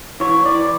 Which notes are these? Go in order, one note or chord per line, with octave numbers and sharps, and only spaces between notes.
E3 C#5
E3 D5